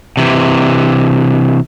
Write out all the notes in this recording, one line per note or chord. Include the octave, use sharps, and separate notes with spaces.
C3 E3